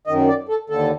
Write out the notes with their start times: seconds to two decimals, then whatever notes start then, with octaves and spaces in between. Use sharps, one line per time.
0.07 F#2 D#3 D#5
0.28 D5
0.49 A4
0.69 D#2 D3 A4